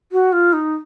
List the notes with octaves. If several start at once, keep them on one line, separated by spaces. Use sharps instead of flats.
F#4
F4
D#4